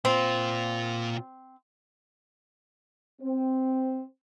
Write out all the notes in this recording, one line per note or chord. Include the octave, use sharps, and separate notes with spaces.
A#2 C4 F4
C4